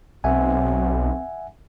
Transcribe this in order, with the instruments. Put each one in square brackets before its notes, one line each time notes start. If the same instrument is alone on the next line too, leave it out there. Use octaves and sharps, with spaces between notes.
[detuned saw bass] B1 [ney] C4 [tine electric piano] E5 F#5 G#5